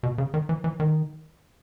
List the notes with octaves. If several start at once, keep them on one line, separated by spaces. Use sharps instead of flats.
B2
C#3
D#3
E3
E3
D#3